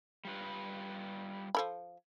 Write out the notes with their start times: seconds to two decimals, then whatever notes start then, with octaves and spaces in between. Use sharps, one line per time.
0.25 G3 F4 B4
1.55 F3 A4 B5